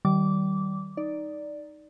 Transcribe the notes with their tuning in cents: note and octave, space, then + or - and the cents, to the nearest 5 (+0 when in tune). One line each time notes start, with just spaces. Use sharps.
D#3 +0 G3 -30 D6 -15
D#4 +0 D5 +0